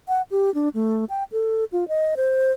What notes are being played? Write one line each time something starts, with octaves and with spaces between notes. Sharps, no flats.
F#5
G4
D4
A3
G5
A4
F4
D#5
C5